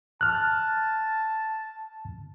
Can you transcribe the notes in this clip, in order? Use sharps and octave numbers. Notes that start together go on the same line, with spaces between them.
A5 F6 F#6